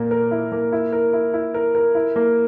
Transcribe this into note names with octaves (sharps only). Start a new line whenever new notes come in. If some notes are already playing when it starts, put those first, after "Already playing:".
Already playing: A#2 A#3 A#4
A#4
E4
A#3
E4
A#4
E4
E4
A#4
A#4
E4
A#3